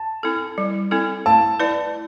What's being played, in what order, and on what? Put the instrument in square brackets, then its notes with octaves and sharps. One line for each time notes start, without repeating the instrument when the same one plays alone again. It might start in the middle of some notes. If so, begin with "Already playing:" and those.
Already playing: [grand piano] A5
[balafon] C4 E4 A4
G3
C4 E4 A4
[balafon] A3 [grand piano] A5
[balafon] E4 B4 D5